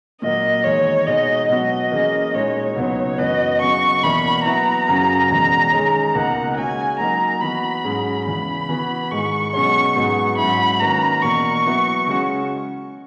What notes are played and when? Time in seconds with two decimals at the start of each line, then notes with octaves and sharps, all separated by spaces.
0.22 A#2 F#3 A#3 D#5
0.64 E2 D#3 G#3 C#5
1.07 B2 G#3 D#4 D#5
1.49 B2 F#3 B3 F#4 D#5
1.92 E3 A#3 C#4 G#4
2.34 A#2 G#3 D#4 F#4 C#5
2.76 C#2 B2 F#3 B3 D#4
3.18 F#2 E3 B3 F#4 B4 D#5
3.61 C#3 F#3 B3 C#6
4.03 E2 B2 A#3 E4 B5
4.45 F#3 B3 E4 A#5
4.88 F#2 C#3 F#3 C#4
5.30 E2 B2 G#3
5.72 D#3 G#3 C#4 G#4 C#5
6.14 C#2 B2 A#3 D#4 A#4 F#5
6.57 C#3 G#3 C#4 F#4 G#5
6.99 F#3 A#3 D#4 A#4 A#5
7.41 E3 B3 F#4 B5
7.84 G#2 F#3 C#4 G#4
8.26 E2 C#3 E3 B5
8.69 E3 B3 F#4 B4
9.11 G#2 D#3 G#3 C#6
9.53 B2 F#3 C#4 G#4 C#5 C#6
9.96 G#2 F#3 B3 D#4 G#4 C#6
10.38 G#2 F#3 C#4 E4 B5
10.80 D#3 A#3 C#4 F#4 B4 A#5
11.22 E2 B2 A#3 C#6
11.65 F#3 B3 E4 B4
12.07 C#3 G#3 C#4 F#4